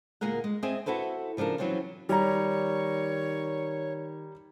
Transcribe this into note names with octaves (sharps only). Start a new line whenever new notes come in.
D2 A#2 A#3 G#4 A#4 F#5
G#3
C4 G#4 D#5 E5 G#5
E4 F#4 A4 B4 C5
C#3 F3 D4 A4 A#4
E3 F#3 C4 C#4 F4
D#3 G3 C#5 A#5